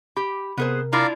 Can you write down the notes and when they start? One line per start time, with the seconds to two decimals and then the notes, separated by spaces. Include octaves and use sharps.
0.17 G4 B5
0.58 C3 B3 G#4 A#4 C5
0.93 D4 E4 F4 D5 F5 A#5